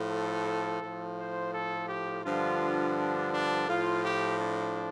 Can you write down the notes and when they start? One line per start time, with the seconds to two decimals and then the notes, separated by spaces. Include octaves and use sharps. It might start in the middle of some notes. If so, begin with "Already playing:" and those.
Already playing: A2 F3
0.11 A4
0.82 A2 F3
1.18 C5
1.54 A4
1.89 G4
2.25 G2 D3 F3 F4
2.97 D4
3.33 D4
3.68 A2 F3 F4
4.04 G4
4.39 D4